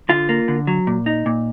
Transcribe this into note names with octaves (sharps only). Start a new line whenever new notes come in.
D3 F4
A#3
D3
F#3
A#2
D#4
A#2